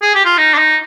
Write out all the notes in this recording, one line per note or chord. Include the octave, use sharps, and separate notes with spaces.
G#4
G4
F4
D#4
D4
D#4